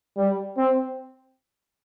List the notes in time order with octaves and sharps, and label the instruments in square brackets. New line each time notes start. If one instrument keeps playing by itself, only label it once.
[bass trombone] G3
C4